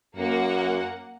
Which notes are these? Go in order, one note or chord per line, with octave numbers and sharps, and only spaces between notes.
F#2 A#3 F#5